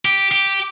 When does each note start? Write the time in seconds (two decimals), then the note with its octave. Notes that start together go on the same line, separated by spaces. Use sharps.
0.05 G4
0.31 G4